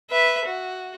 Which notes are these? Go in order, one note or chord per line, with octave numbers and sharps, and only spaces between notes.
B4 E5
F#4